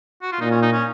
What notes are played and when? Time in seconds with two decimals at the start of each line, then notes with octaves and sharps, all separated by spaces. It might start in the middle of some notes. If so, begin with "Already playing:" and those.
0.22 F#4
0.32 F4
0.41 A#2 D#4
0.51 C#4
0.62 D#4
0.73 C#4